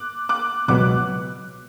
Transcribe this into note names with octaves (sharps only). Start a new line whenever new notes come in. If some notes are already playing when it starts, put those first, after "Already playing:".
Already playing: D6 F#6
D6 F#6
C#2 B2 F#3 B3 D6 F#6